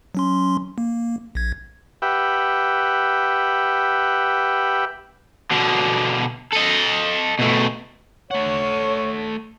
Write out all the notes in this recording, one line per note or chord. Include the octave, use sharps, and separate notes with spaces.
F#3 C#4 C6
A#3
A#1 G#6
G4 B4 E5 F#5 G5
B2 D3
A4 D#5
B2 A3
A3 C#5 F#5